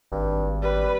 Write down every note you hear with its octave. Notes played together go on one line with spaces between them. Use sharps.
G#1 G2
G3 B4